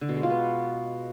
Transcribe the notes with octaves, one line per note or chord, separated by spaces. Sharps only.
D3
B2
G#3
F4
B3